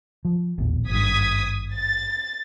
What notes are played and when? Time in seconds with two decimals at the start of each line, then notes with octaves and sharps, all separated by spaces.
0.25 F3
0.58 D#1 A1 E2
0.90 G#1 G2 D#6 G#6 B6
1.75 A6